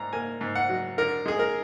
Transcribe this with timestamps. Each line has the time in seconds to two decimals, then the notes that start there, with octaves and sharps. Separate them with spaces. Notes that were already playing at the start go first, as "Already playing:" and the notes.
Already playing: G#2 A#3 A#5
0.13 A#3 G#5
0.41 G#2
0.56 F#5
0.69 F#3
0.98 D3 A#4
1.26 G#3 G#4
1.39 A#4